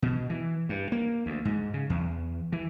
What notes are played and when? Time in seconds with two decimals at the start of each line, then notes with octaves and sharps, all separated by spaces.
0.02 B2
0.30 E3
0.69 G2
0.92 A#3
1.26 D2
1.45 G#2
1.74 C#3
1.90 E2
2.52 E3